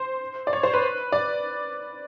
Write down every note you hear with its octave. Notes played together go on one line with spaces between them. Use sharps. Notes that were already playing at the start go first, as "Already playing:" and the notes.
Already playing: C5
D5
C#5
C5
B4
D5